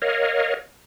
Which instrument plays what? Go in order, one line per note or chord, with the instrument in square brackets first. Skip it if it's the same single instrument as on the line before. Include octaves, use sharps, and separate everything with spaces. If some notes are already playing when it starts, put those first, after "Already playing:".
[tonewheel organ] A#4 C#5 D#5 F5